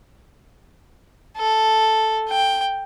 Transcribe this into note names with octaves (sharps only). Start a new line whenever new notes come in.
A4
G5